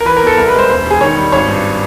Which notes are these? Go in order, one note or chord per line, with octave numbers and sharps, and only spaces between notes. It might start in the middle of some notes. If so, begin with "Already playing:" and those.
A#4
E3 B4
A#4
E2 A4
C2 A#4
B4
G#3
C5
E1 C5
E1 G#4
D#3 C#5
G3
G#1 C#5
G2